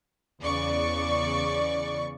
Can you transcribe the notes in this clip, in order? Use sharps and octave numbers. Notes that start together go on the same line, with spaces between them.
E2 C#3 D5 C#6